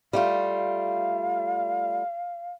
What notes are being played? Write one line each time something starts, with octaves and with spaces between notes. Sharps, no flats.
G3 A3 F4 F5